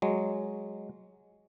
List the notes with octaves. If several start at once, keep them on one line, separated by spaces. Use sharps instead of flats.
F#3 G#3